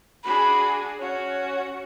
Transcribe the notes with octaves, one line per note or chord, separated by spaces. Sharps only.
D4 F#4 G#4 B5
C#4 F#4 C#5